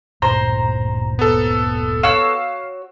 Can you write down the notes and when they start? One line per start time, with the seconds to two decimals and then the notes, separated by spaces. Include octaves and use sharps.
0.22 D1 G2 A#2 C5 A#5
1.19 B3 A4
2.03 F#4 C#5 F5 E6 E7